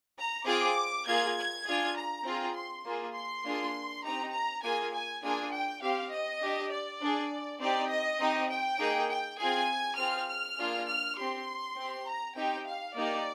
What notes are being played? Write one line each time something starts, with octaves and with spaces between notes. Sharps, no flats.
A#5
C4 F4 G#4 D6
A#3 F4 G#4 G#6
G#6
D4 F4 G#4
A#5
C4 F4 G#4
C6
A#3 F4 G#4
C6
A#3 D4 F4 G#4
C4 D#4 G4 A#5
A#5
A#3 F4 G#4 G#5
G#5
A#3 D4 F4 G#4 G#5
G5
C4 G4 F5
D#5
D4 G4
D5
D4 G#4
C4 D#4 G4 D5
D#5
C4 D#4 G4
G5
A#3 D#4 G#4
G5
C4 F4 G#4 G#5
C4 F4 G#4 F6
F6
A#3 D4 F4 G#4
F6
C4 G4 C6
C4 G4
A#5
C4 D#4 G4 G5
F5
A#3 D#4 G4 D5